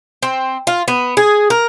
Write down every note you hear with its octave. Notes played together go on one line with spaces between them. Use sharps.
C4
F4
B3
G#4
A#4